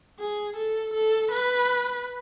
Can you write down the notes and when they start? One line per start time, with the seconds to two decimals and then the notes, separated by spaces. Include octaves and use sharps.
0.19 G#4
0.56 A4
0.94 A4
1.31 B4